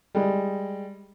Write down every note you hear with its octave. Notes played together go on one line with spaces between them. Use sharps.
G3 G#3